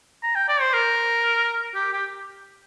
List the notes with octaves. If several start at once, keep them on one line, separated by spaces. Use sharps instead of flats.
A#5
G5
D5
C5
A#4
G4
G4